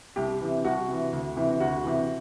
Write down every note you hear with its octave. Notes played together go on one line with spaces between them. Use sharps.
C2 G4
C3 E3
C2 F#4
C3 E3
D2
C3 E3
D2 F#4
C3 E3